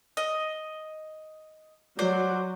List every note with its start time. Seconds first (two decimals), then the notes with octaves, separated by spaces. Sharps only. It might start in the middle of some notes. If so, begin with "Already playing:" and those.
0.17 D#5
1.99 F#3 C5 D5